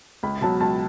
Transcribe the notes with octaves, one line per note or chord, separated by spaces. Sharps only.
C#2 B5
B2 F#3 A5
C#2 A5